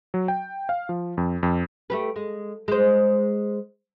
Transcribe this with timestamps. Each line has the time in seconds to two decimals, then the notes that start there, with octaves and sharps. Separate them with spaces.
0.14 F#3
0.28 G5
0.69 F5
0.89 F3
1.17 F2
1.43 F2
1.90 A3 G4 B4
2.16 G#3
2.68 G#3 C5